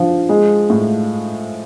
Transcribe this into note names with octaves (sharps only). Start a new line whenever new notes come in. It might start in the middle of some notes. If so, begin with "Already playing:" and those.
Already playing: F3 D4
G#3
A2